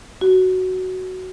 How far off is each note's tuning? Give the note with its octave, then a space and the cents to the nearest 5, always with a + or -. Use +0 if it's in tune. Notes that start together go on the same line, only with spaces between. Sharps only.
F#4 +5